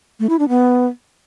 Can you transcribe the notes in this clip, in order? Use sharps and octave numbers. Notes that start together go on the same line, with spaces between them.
A3
E4
D4
B3